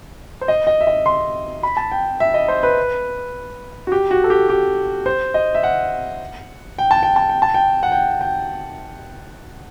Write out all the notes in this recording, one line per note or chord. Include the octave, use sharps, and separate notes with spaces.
C5
D#5
D#5
E5
D#5
C6
B5
A5
G5
E5
D#5
C5
B4
F#4
G4
F#4
A4
G4
G4
C5
D#5
E5
F#5
G5
A5
G5
A5
G5
A5
G5
F#5
G5
G5